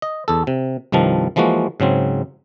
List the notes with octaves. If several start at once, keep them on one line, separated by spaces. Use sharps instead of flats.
D#5
E2 A4
C3
C2 G2 D#3 F3 A5
E3 F3 G#3 A#3 F#4
G#2 C#3 F#3 C4